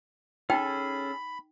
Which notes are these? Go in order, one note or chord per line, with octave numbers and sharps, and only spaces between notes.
C#4 D#4 G#4 A4 G5 B5